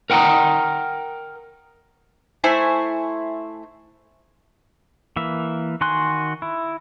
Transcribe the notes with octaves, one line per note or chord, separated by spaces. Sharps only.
A#4 F#5 G5 A#5
A3 E4 C5 G#5
E3 A#3 E5
D#3 F#4 G#5 C6 F#6
E4